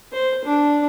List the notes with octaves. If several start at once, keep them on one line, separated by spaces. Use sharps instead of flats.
C5
D4